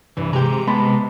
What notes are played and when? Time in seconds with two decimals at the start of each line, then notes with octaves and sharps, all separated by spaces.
0.17 C2 G2 E3
0.33 C3 G#3 G4 A#5
0.67 G#3 B3 A5 B5 C6